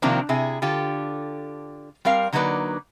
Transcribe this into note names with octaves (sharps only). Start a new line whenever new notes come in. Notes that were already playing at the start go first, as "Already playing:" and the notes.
C3 D#3 F3 A#3 C4 D4
C3 E4 G#4
D3 F4 G4 A4
G3 C4 A#4 F5
D3 F#3 A#3 D#4 B4 D5